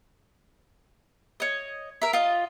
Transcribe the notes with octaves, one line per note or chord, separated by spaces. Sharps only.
C#5 D#5
A#4 E5
F4 D#5